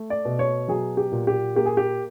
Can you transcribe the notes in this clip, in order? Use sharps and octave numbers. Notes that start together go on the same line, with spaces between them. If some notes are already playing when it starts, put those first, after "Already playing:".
Already playing: A3
D5
B2
C#5
F#3 G#4
G4
A#2
G4
A#3 G4
G#4
G4